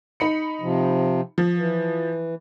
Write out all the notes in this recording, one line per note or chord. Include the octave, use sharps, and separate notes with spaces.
D#4 B5 C#7
C3 F3
F3
E3